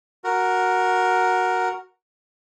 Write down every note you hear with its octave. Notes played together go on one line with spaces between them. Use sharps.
F#4 A#4